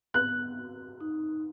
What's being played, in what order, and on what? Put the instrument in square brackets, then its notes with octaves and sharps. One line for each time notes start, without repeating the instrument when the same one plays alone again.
[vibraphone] B3 [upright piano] F#6
[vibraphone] F#4
D#4